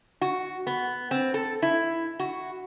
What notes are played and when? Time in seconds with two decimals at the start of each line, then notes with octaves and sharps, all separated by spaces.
0.21 F#4
0.67 B3
1.11 C4
1.34 A4
1.62 E4
2.20 F#4